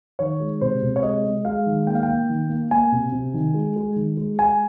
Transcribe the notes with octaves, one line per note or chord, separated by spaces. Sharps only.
D#3 C#5
G#3
C3 C5
C3
C#5
G#3 D#5
G#3
G#3 F5
D#3
A#3 G5
F5
G5
A#3
D#3
A#3
A#3 G#5
C3
C3
D#3
G#3
G#3
D#3
G#3
G#3 G#5